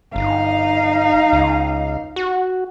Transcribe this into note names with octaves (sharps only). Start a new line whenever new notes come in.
G1 D#4 F5
C#2
F#4